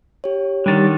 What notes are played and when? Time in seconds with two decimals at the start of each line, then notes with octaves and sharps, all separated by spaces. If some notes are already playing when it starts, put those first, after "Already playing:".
0.24 G4 C#5
0.66 D3 D#3 G3 A6